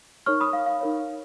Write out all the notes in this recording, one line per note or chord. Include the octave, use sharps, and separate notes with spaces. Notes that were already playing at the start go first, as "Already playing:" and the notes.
D#4 A#4 C#5 C#6 F6
B5 D#6
F5
F5
D#4 A#4 C#5